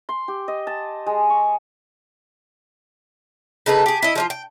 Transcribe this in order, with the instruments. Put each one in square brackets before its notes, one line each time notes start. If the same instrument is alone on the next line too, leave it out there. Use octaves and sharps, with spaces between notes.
[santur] C6
G4
D#5
A5
G#3
C#6
[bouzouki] C#3 D#4 A4 B4
G4 G#4
E4 D#5
F3 D4 F4
G5